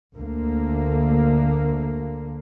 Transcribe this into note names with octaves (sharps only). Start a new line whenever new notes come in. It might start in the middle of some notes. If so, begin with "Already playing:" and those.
D2 D3 A#3